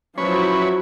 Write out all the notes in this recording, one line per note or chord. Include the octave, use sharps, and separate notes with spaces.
F3 F#3 C#4 E4 B4 C#5